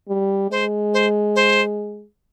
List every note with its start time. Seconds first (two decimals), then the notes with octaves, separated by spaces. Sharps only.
0.09 G3
0.51 G#3 C5
0.94 C5
1.36 C5